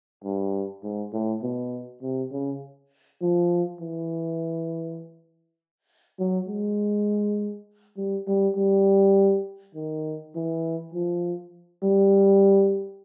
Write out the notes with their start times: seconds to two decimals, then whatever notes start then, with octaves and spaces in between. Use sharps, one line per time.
0.24 G2
0.83 G#2
1.13 A2
1.42 B2
2.02 C3
2.32 C#3
3.21 F3
3.80 E3
6.19 F#3
6.48 G#3
7.97 G3
8.27 G3
8.56 G3
9.75 D#3
10.35 E3
10.94 F3
11.83 G3